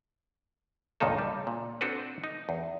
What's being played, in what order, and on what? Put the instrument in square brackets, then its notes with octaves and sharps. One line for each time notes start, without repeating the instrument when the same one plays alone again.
[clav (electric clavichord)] C#2 G2 A#2 D#3 D#4 A4
G3
A#2
C4 D4 F#4 A4 B4
D#4
E2